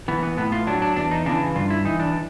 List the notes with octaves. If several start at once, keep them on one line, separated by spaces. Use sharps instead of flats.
E3 B3
B3
A2 B3
F4
F#3 D4
D4
E2 D4
D#4
C#3 E3 D4
G2 F4
E4
E3 D#4
D4